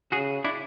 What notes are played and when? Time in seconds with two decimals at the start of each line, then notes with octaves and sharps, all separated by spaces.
0.12 C#3 F#4 G#4
0.44 D4 E4